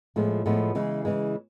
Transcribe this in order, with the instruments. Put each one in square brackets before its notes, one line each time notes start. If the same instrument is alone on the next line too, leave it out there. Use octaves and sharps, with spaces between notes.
[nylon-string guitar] A2 F3 G#3 B3
A2 F3 G#3 B3
C#3 E3 G#3
C#3 E3 G#3